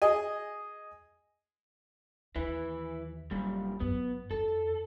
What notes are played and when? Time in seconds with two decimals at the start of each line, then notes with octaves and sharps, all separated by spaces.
0.02 G#4 D#5 G#5
2.35 D#2 E3 E4 B4
3.31 F1 F#2 A#2 G3
3.80 G#1 F#2 B3
4.31 F2 A4